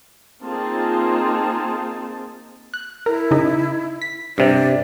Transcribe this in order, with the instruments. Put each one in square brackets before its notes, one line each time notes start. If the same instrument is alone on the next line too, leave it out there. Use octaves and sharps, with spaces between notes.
[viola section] A#3 C4 D#4 F4 G#4 A5
[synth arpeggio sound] F#6
[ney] E4 [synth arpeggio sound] A#4
[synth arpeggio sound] C#3 D#4
B6
[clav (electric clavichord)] G2 C3 [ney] D5